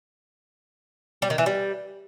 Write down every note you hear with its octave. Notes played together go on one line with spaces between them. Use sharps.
G3
D#3
E3
G3